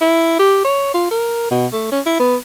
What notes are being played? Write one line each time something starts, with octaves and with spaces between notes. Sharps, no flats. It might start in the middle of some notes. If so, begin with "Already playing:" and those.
E4
G4
C#5
F4
A#4
B2
A3
C#4
E4
B3